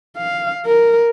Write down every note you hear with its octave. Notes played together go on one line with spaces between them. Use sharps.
F5
A#4